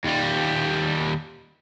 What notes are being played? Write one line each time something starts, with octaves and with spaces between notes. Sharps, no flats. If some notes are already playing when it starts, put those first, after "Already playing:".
D#2 G3